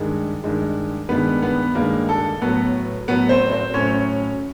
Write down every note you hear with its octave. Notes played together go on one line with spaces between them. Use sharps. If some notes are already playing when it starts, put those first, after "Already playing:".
Already playing: G2 D#3 G#3
G2 D#3 G#3
G2 D#3 G#3 B3 B4
B3 B4
G2 D#3 G#3 A#3 A#4
A4
A2 F#3 A3 B3 B4
A2 F#3 A3 B3 B4
C4 C5
C4 C5
A2 F#3 A3 C#4 C#5